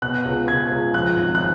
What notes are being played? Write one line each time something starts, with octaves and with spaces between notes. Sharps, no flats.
B2 F#6
C#2
C#2 G#6
C#2
F3 F#6
G#1
F#6